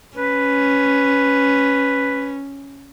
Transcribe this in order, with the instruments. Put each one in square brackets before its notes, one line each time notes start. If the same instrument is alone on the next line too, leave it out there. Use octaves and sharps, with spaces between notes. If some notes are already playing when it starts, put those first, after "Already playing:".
[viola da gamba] C#4 [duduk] B4